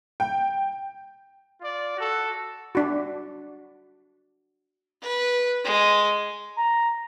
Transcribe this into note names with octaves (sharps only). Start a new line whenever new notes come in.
G5
F4 D5
F#4 A4
D4 F#4
B4
G#3
A#5